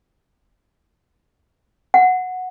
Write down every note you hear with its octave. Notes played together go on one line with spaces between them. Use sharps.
F#5